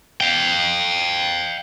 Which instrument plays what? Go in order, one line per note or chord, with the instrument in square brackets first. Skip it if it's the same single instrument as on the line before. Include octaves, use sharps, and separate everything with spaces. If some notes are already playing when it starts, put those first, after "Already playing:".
[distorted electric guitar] F5 G5